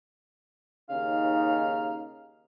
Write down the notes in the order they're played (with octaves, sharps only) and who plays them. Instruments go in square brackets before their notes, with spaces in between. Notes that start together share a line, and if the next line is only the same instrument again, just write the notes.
[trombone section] D#2 C#3 D#4 [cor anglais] F5